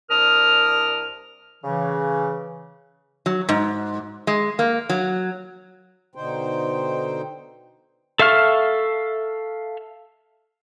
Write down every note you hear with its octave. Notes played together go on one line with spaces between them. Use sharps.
C2 D4 A#4 D#6 F6
C#3 E3
F#3
G#2
G#3
A#3
F#3
B2 D3 D#4 C5 G5
A4 E5 F5 C#6 F6